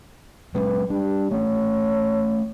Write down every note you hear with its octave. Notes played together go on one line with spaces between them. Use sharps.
F#3 G#3 C#4 B4
G3 D4
A3 C#4 C#5